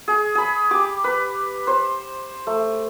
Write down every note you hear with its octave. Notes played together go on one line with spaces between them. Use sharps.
G#4
G#4 B5
G4 D6
B4
C5
A3